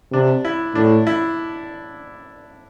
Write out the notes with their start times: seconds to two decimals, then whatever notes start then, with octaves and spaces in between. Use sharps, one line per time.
0.12 C3 D4
0.45 E4
0.75 A2 D4
1.07 E4